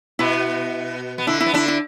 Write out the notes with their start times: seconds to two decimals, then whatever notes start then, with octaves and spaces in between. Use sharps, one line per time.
0.19 B2 B3 E4
1.18 B3
1.27 D3 D4 E4
1.40 E4
1.46 B3
1.54 D3 D4 E4
1.68 E4